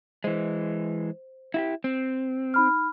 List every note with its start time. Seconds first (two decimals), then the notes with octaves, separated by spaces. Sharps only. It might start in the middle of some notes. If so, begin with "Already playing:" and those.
0.24 E3 G#3 C5
1.54 E4 F#4 G4
1.84 C4
2.54 D#4 B5 F6